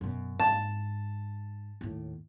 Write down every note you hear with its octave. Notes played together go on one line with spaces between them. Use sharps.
F#2 B2
G#2 A5
D#2 A2